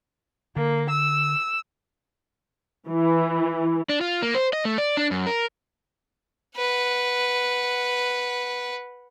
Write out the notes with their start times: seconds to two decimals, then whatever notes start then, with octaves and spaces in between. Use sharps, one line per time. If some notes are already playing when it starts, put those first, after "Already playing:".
0.56 D3 A#3
0.90 E6
2.88 E3
3.89 D4
4.01 F4
4.22 A#3
4.35 C5
4.53 D#5
4.65 A3
4.78 D5
4.97 D4
5.11 F#2
5.27 A#4
6.57 B4 F#5